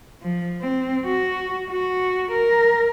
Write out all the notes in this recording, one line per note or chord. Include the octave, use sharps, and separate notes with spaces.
F3
C4
F#4
F#4
A#4